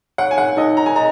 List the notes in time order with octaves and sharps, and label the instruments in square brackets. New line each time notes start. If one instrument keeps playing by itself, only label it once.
[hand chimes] C#5 [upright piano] F#5
[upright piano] G#5
F#5
[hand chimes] D#4 [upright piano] D#5
[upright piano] A#5
G#5
[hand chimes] D#5 [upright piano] A#5